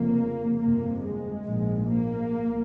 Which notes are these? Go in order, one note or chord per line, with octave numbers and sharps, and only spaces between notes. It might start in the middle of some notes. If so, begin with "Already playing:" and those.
Already playing: F1 F2 C#3 A#3
G1 F2 C3 A#3
G#3
A#1 G#2
A#3
C2